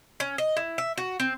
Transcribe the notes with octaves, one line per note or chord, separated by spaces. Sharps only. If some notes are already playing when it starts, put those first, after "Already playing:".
C#4
D#5
E4
E5
F#4
C4